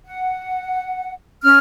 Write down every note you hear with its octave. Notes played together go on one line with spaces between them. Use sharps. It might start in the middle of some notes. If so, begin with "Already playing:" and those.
F#5
C#4 F6